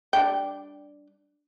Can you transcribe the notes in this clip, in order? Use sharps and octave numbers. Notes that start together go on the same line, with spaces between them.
G3 D4 G5